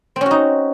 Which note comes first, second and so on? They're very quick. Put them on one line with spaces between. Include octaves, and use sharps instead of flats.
C4 C#4 F#4 D#4